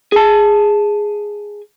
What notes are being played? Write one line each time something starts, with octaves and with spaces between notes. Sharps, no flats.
G#4 A5